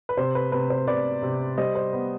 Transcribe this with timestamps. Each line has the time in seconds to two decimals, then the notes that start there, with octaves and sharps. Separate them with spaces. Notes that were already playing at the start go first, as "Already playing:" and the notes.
0.09 B4
0.17 C3 C5
0.35 B4
0.52 C3 B4
0.70 C5
0.87 C3 B4 D5
1.22 C3
1.58 G3 C5 D#5
1.75 C5
1.93 B3